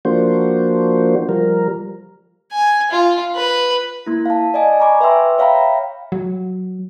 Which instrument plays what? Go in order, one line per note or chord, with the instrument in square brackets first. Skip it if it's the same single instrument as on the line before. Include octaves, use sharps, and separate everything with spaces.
[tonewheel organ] F3 A#3 D4 F#4 C5
F3 G3 A#4
[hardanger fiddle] G#5
F4
B4
[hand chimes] A#3 E4
F5 A5
D5 D#5 G#5
G#5 A#5 B5 C#6 D6
B4 E5 G5 C6 E6
C#5 E5 F5 G5 A#5 B5
[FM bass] F#3